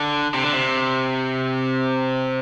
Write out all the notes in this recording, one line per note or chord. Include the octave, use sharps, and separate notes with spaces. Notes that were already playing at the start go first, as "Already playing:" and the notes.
Already playing: D3
C3
D3
C3